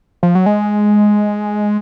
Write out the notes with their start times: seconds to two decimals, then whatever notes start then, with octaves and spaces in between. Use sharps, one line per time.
0.23 F3
0.35 F#3
0.46 G#3